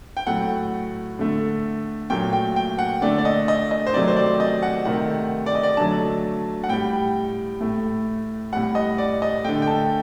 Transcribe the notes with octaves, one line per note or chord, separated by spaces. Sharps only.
G5
A2 F#3 A3 F#5
D3 A3
A#2 F#3 A3 G5
G5
G5
F#5
D3 A3 D5
D5
D#5
D#5
D#5
C5
C3 D#3 F#3 A3 D5
C5
D5
D#5
F#5
C3 D#3 A3 F#5
D5
D#5
D5
D3 F#3 A3 A5
F#5
A2 G3 G5
A2 A3
A2 G3 F#5
D#5
D5
D#5
D3 A3 G5
G5
A5